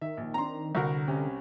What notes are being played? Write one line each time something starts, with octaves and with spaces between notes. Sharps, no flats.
D#3 E5
A#1
C4 D4 A#5 C6
C2 D3 F#4 A#4
C3 C#4 G#5